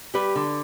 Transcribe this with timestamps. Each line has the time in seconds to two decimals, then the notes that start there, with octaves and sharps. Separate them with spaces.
0.14 G3 G4 B4
0.36 D3